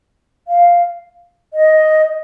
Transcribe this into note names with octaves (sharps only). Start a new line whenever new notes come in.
F5
D#5